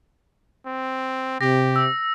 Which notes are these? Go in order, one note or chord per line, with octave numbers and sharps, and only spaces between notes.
C4
C3 G4 A#6
E6